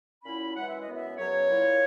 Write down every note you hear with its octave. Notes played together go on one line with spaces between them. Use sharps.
A#2 F#3 C#4 E4 B5
F#2 E3 G#3 F#5
E5
D#5
F#2 E3 B3
E5
F#2 C#3 F#3 B3 C#5
A#2 A#3 E4